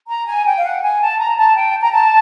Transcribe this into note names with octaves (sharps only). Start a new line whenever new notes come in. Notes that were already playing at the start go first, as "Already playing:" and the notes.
A#5
G#5
G5
F5
F#5
G#5
A5
A#5
A5
G5
A#5
A5